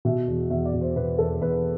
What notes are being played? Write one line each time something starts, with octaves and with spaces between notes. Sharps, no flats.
B2 E5
E2
E2 E5
D5
B2
C5
B2 B4
E2 A4
E2 B4